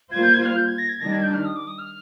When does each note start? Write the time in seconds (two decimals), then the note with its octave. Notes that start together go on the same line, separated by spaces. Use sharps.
0.12 G3 A#3 F4 C5 G#6
0.23 G6
0.33 G#6
0.45 F6
0.56 G6
0.68 G#6
0.78 A#6
0.89 G#6
1.01 D#3 G3 D4 A#6
1.12 G#6
1.23 G6
1.34 F6
1.45 D#6
1.56 D6
1.67 D#6
1.79 F6